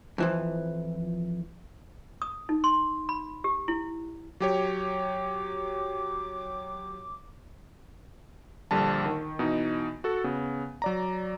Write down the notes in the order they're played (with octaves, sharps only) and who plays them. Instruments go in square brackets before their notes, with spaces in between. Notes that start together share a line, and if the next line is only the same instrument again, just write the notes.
[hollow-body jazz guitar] F2 E3 F3
[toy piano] D#6
D#4
C6
B5
G4
E4
[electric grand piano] F#3 G4 C#5 [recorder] D6
[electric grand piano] A#1 D3 G3 A5
D#3
B2 E3 D#4
F#4 A4
C#3 B3
F#3 D5 A#5